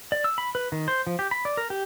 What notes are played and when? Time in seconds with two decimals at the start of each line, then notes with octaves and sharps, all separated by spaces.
0.12 D5
0.24 E6
0.38 B5
0.55 B4
0.72 D#3
0.88 C5
1.07 F3
1.19 G4
1.31 B5
1.45 D5
1.57 A#4
1.70 G4